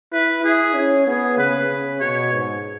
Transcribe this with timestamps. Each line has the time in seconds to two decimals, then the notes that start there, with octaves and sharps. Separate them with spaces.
0.12 E4 B4
0.44 E4 G#4
0.75 C#4
1.07 B3 G#4
1.38 C#3 B4
1.70 C#3
2.01 B2 C#5
2.33 G#2